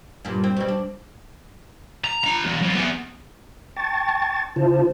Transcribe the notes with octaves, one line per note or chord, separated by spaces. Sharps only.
G2 A#2
C4
B2 G3
D4
A#5
D4 A#5
E2 F#4
F#2 C4
B3 G#4
G5 A5 C#6 A6
C#3 E4 F4 C5 A5